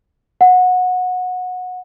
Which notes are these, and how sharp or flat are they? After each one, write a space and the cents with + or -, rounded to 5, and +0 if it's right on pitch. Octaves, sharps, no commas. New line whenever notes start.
F#5 -20